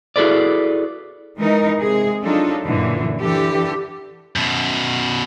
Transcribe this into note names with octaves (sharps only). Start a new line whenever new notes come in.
E4 F#4 G#4 A4 B4 D5
E3 G#3 D#4 A#4
C3 G#3 G#4
F#3 D4 D#4 F4 A4
F#2 A#2 D3 E3
D3 E3 G4 A4
F#2 B2